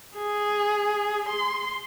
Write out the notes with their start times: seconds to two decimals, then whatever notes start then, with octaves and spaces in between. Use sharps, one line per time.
0.17 G#4
1.29 C6